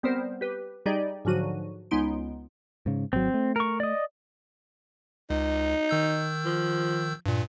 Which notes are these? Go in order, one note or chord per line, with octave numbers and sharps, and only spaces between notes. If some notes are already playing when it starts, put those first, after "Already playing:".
G3 B3 C4 A#4 C5
G4 B4
G3 D#4 G4 G#4 D5 D#5
G#2 D3 F3 F#3 F#4 D#7
C#2 G#3 B3 D#4 C6 D7
G#2 C#3
G#1 F#3 C4
A3
A#4 C#6
D5 D#5
C#2 D#4
D#3 E6 G6
F3
G2 A#2